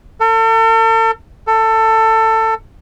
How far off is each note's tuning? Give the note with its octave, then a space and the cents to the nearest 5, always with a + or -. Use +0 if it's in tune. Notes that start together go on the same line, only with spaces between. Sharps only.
A4 +40
A4 +20